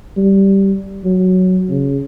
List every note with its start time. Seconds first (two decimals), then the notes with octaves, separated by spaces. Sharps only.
0.17 G3
1.04 F#3
1.69 C#3